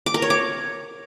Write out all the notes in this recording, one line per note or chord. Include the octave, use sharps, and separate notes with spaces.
D6
A#4
C#5
D6